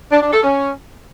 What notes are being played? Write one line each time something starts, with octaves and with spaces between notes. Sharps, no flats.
D4
D4
A4
C#4